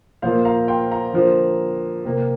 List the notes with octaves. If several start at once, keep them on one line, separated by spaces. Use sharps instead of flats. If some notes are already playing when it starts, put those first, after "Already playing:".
A#2 F3 A#3 C5 F5
F5 A#5
G5 C6
F5 A#5
D3 F3 A#3
C3 A#3